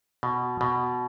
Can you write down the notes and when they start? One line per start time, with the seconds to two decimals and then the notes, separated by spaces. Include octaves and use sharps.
0.23 B2
0.61 B2